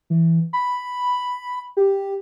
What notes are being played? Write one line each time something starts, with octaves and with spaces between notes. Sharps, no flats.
E3
B5
G4